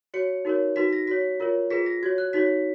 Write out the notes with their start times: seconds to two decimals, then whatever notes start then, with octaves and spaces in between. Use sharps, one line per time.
0.14 F#4 C#5 C#7
0.45 D#4 F#4 A#4 C#5
0.76 D#4 F#4 B4 B6
0.93 A#6
1.07 F#4 C#5 B6
1.40 F4 A#4 C#5
1.71 F4 G#4 B4 B6
1.86 A#6
2.03 F#4 G#6
2.06 C#5
2.18 F#6
2.33 D#4 F#4 C#5 B6